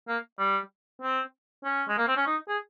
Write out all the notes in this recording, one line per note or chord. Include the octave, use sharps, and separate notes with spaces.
A#3
G3
C4
C#4
G#3
A#3
C4
C#4
D#4
G#4